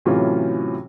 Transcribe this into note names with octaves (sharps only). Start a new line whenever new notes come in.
A2 C3 E3 F#3 C#4 F4